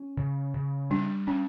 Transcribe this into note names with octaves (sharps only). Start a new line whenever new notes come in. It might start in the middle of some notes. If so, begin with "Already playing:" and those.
Already playing: C#4
C#3
C#3
G3 D4
C#4 D4